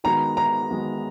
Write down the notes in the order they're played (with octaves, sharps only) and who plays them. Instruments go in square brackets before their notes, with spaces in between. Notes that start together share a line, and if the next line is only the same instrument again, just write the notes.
[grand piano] D#3 G#3 B3 F#4 [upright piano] A#5
[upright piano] A#5
[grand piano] D#3 G#3 B3 F#4